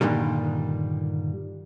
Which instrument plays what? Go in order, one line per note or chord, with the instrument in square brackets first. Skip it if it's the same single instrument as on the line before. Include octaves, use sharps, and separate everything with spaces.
[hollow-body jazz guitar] G2 A#2 D3 D#3 G3